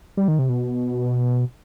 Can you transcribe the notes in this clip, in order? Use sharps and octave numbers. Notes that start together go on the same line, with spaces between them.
G3
D#3
C3
B2